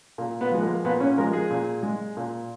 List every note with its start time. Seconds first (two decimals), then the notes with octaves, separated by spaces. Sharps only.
0.18 A#2
0.41 B3
0.51 F3 G#3
0.62 A#3
0.85 A#2 B3
1.00 C#4
1.17 F3 G#3 A#4
1.33 G#4
1.51 A#2
1.83 G#3
2.17 A#2